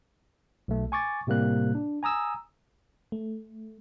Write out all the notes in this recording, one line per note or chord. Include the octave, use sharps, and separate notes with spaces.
B1 A3
G#5 C#6 D6 A6
A2 C3 G3 A#3 F#6
D4
G#5 A#5 D#6 E6
A3